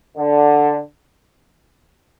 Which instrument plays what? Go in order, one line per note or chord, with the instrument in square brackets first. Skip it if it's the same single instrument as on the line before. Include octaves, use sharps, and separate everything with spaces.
[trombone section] D3